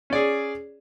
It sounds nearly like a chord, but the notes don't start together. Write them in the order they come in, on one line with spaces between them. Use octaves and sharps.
C#4 D5 G#4